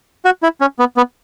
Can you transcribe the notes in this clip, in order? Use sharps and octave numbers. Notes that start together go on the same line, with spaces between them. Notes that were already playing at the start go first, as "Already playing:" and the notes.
F#4
E4
C#4
B3
B3